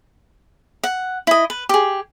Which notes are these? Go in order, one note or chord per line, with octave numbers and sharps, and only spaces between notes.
F#5
E4 D#5
B4
G4 G#4